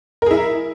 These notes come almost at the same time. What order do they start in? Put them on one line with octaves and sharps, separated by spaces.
A#4 G#4 E4